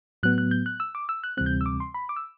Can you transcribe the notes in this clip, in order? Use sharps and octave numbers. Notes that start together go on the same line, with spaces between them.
A2 F#3 B3 F#6
F#6
G6
F#6
E6
D6
E6
F#6
D2 C3 E3 G3 C4 F#6
G6
E6
D6
C6
B5
D6
E6